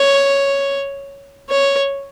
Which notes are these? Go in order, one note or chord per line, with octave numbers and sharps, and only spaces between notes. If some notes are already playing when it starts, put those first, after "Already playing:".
Already playing: C#5
C#5